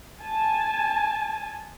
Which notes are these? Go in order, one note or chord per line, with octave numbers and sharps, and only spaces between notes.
G#5 A5